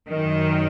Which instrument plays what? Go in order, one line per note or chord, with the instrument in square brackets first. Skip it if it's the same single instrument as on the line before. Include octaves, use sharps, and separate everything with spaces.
[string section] F#2 D#3